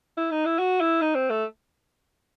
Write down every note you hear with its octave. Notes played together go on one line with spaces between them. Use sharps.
E4
D#4
E4
F#4
E4
D#4
C4
A3